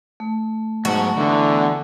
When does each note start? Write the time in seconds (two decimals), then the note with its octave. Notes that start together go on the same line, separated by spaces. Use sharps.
0.20 A3
0.85 G#2 F#3 B3 F#4 A5
1.17 D3 E3 B3